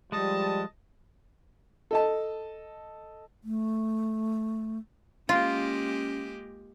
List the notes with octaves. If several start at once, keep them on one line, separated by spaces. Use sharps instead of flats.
F3 G3 G#3 D#5 A5
A4 D#5 A5
A3
G#3 A#3 C#4 F4 G4